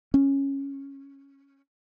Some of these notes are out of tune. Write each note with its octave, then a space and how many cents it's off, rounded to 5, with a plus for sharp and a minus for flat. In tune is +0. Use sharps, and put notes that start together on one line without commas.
C#4 -5